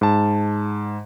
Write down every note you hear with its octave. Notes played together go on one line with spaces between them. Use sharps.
G#2 A5